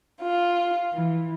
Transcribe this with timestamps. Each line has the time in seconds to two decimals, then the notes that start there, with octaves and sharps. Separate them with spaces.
0.22 F4
0.92 E3